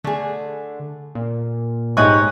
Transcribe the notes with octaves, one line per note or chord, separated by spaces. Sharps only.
D3 A3 G#4
A#2
G#2 G4 C#5 D#5 G#5 C#6 F#6